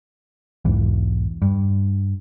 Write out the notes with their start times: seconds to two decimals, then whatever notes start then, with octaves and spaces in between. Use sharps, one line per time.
0.65 B1 E2 G#2 E3
1.42 G2